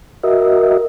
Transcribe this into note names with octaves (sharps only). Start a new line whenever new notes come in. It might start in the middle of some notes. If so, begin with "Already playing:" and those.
F#4 A#4 D#5 E5